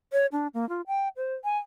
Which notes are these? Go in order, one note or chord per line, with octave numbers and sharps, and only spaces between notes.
C#5
D4
A#3
F4
G5
C5
G#5